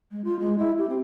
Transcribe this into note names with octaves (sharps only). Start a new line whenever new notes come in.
G#3
F4
G#3
E4
G4
C4